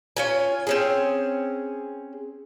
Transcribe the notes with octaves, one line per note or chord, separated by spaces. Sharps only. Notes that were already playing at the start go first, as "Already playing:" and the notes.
C#4 F4 G#5
C4 C#4 G#4